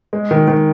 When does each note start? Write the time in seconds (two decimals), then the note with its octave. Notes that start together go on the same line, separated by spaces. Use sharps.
0.13 G#3
0.31 D#3
0.48 D#3